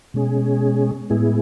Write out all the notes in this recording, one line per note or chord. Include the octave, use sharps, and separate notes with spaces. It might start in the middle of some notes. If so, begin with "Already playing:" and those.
B2 G#3 C#4 G#4
A2 G#3 B3 E4 G#4